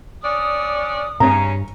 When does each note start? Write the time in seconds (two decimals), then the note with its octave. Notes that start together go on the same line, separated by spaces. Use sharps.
0.22 C#4 D4 D5 D#6
1.20 G2 C#3 C#4 A#5